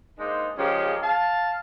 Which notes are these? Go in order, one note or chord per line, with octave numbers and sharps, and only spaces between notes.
G#3 A#3 D4 D#4 C5
C#3 F3 G#3 C#4 G4 A#4
F5 A5